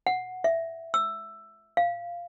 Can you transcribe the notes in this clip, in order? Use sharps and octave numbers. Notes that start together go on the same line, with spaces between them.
F#5
E5
E6
F5